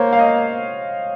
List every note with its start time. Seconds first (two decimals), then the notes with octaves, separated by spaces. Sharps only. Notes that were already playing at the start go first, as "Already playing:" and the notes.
Already playing: A#3 C5 C#5
0.13 F5
0.19 D#5